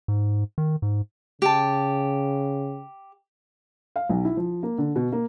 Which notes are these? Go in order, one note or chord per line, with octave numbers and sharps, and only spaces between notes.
G#2
D#3
G#2
C#3 G4 A5
F5
B1
E4
F3
A#3
D3
B2
A#3